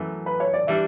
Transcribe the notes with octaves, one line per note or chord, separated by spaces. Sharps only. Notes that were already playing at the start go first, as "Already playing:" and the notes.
Already playing: F#2 E3 A3
B4
C#5
D5
E3 G3 D4 E5